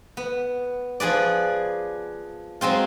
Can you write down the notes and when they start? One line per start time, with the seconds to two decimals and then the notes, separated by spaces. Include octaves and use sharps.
0.17 B3
1.00 F3 G#4 B4 D5
2.61 F#3 G#3 C4 F4